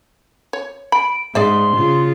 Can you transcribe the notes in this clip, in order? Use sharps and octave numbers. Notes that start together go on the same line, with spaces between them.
C#5
B5 D7
G#2 G#4 D5 E5 C6
C#3 F4